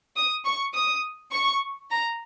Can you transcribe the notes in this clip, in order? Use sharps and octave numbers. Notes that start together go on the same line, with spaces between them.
D#6
C#6
D#6
C#6
A#5